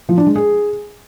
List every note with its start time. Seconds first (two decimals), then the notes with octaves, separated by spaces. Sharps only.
0.09 F3
0.18 D4
0.27 G#3
0.35 G#4